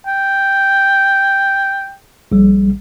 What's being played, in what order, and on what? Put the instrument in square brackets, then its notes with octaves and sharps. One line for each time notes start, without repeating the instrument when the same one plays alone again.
[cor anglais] G5
[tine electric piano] A#1 G3